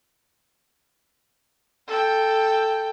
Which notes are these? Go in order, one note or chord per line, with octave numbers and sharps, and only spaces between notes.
A4 G5